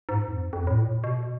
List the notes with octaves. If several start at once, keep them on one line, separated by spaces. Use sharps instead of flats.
G#2
F2
F2
A2
A#2
B2